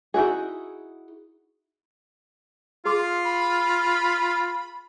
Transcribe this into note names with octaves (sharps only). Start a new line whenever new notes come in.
D#4 E4 F#4 G#4
F4 G#4 C6 D6
B5